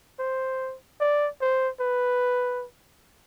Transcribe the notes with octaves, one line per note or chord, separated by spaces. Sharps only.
C5
D5
C5
B4